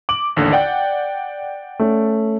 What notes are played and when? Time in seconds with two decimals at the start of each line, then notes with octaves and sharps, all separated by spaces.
0.09 D6 F#7
0.36 A1 D#2 D3
0.52 D5 F#5 G5
1.79 A3 C#4